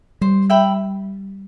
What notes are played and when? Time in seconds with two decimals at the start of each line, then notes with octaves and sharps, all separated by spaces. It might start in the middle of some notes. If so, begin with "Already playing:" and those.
0.21 G3 C5
0.50 E5 G5 B5